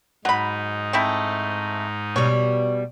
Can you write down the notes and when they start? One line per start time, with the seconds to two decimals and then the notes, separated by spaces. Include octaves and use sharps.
0.25 G#2 F#3 D#4 B5
0.93 A3 C4 E4
2.16 B2 G3 C#5